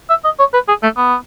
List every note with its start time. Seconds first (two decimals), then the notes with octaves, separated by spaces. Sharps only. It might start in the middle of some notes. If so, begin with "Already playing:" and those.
0.09 E5
0.24 D#5
0.39 C#5
0.54 B4
0.68 G#4
0.83 A3
0.97 B3